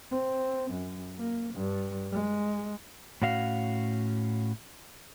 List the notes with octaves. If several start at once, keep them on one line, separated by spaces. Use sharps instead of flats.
C4
F#2
A#3
G2
G#3
A2 C#4 F#4 F5